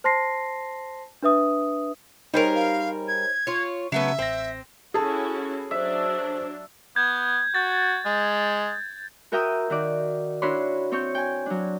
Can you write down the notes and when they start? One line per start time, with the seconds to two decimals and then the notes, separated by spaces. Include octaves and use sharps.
0.04 C5 A5 C6 A#6 C7
1.22 D4 B4 E5 D#6
2.34 G3 D#4 G#4 A#4 C5 C#5
2.55 F5
3.08 G#6
3.47 F4 C#5
3.92 C#3 F#3 A3 B3 E5
4.19 A1 C4 A#6
4.94 C#4 E4 F#4 G#4 A4 A5
5.71 F#3 D4 C5 E5
6.96 B3 G6 G#6
7.55 F#4 G6 A6
8.05 G#3
9.32 F#4 A#4 E5 G5 A#5 D#6
9.70 D#3 F#4 D5
10.42 D4 E4 F#4 C#5 B5 C6
10.92 C4 C#5 C#6 G6
11.15 G5 G#5
11.46 F#3 D4